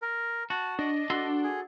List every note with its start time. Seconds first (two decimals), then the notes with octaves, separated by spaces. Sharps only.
0.02 A#4
0.50 F#4 A5
0.79 D4 D#5
1.10 F#4 A4 C6
1.44 G#4